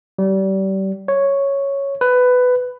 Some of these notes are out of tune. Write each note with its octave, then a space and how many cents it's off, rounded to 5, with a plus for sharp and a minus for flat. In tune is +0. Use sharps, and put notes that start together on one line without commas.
G3 -30
C#5 +0
B4 +15